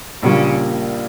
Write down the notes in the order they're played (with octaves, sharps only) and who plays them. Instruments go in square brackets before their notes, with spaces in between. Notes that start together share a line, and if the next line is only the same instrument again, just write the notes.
[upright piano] A#1 A#2 G3 A#3 [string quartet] C#3 C#4